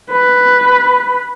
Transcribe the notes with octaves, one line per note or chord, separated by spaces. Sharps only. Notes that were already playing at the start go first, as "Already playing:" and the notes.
B4